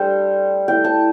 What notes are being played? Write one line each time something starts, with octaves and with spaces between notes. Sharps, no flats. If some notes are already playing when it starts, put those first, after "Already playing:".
Already playing: G3 A3 D4 A4 C5 G5 A5
A3 E4 G5
A5